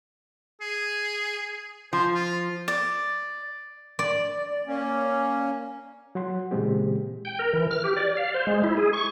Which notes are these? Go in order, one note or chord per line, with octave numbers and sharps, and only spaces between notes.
G#4
F3 C5
F4
D5
D5
A#3 C#4
F#3 F#5 C6
A#2 C#3 E3 G#3 C4 G4
G5
A#4
E3
F6
G4
D5
F5
C5
G#3
E4
G#4
C#6